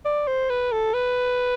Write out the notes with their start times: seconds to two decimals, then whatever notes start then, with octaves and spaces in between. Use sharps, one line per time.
0.05 D5
0.28 C5
0.50 B4
0.72 A4
0.94 B4